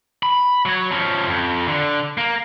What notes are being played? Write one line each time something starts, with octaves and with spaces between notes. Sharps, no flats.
B5
F#3 C#5
F3 C#4
F2
D3
A#3